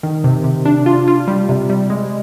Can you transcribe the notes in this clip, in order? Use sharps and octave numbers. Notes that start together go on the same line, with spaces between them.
D#3
C3
C3
D4
F4
F4
G3
C3
G3
G#3